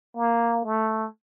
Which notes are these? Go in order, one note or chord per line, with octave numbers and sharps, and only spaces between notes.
A#3
A3